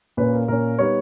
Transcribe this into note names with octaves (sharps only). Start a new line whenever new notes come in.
A#2 A#3 C#4 B4
A#4
A#2 A#3 C#4 A#4
G3 B3 D#4 C#5